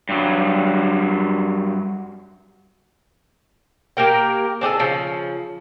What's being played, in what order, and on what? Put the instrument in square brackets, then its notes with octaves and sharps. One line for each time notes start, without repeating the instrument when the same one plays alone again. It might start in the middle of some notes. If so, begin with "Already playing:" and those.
[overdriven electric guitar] G2 F#3
[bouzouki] A#3 G4 A#4 G5
C4 D4 G#4 A4
C#3 F3